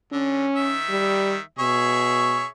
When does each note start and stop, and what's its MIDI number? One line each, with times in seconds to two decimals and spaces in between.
0.12 0.46 50
0.12 0.76 61
0.56 1.40 51
0.56 1.40 76
0.90 1.36 55
1.59 2.44 47
1.59 2.46 68
1.59 2.46 73
1.59 2.46 76